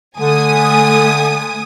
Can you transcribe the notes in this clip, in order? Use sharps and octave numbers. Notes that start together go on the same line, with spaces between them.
D3 A3 G#5 D#6